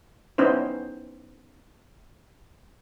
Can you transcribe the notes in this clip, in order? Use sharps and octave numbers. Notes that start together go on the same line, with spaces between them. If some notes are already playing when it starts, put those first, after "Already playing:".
B3 C#4 D#4 E4 C5